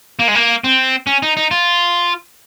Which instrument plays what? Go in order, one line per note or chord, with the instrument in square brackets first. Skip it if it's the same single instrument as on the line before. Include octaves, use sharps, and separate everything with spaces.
[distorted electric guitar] A#3
G#3
A#3
C4
C#4
D#4
D#4
F4